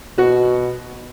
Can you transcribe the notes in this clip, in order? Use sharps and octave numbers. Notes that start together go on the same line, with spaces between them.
B2 F#4